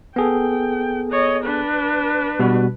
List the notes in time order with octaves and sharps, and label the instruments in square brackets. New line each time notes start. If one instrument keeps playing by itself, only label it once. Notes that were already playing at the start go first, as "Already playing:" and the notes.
[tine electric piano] B3 G#4 A4 [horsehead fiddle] G5
[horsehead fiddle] C#5 D#5
D4 B4
[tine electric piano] B2 G3 F#4